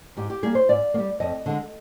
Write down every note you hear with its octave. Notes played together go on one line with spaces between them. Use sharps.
G#2 G4
G4
G3 A#3 G#4
C5
G#2 D5
A#3
G3
F2 D#5
D3 G#3